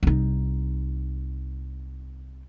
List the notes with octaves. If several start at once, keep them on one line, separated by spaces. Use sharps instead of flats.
C2 D#4